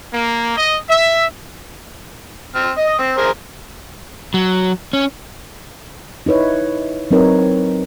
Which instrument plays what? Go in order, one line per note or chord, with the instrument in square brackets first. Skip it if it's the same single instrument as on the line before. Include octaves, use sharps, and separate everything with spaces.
[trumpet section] A#3
D#5
E5
[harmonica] C4 F6
D#5 D#6
C4
G#4 A#4 C5
[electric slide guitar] F#3
C#4
[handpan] D#4 E4 B4 C#5
F#3 C4 D#4 A#4 B4 C#5